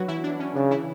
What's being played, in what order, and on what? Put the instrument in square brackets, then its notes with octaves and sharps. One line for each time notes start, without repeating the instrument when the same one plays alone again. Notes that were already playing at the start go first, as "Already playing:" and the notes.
Already playing: [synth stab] F#3 B3 D4 F#4 B4
E3 E4
D4
C#4
[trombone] C#3 [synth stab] D4
[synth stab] E3 E4